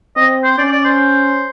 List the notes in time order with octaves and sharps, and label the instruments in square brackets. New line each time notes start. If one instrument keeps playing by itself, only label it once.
[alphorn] C4 [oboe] D#5
[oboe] C5
[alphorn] C#4 [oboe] D5
[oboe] D5
C5